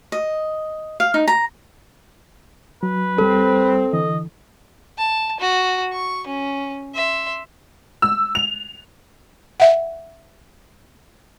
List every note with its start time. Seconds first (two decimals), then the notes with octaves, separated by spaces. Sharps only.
0.12 D#5
1.00 F5
1.14 D#4
1.28 A#5
2.83 F#3 B4
3.18 C2 G3 C4 A4
3.93 D3 E3 D#5
4.98 A5
5.40 F#4
5.93 C#6
6.27 C#4
6.95 E5 C6
8.02 E6
8.35 F7
9.60 E5 F#5